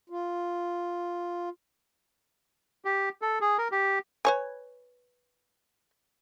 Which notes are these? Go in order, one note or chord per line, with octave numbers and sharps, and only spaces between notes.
F4
G4
A4
G#4
A#4
G4
B4 C#5 G#5